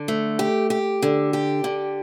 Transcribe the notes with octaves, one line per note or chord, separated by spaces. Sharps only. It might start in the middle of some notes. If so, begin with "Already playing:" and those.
Already playing: D3
A3
G4
G4
D3
G4
D3